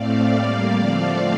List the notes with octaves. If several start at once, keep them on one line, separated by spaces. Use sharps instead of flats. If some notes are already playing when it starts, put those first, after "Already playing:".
Already playing: A2 A3 C4 D5 F5
A2 G3 A#3 D5 F5
D3 F3 A3 C4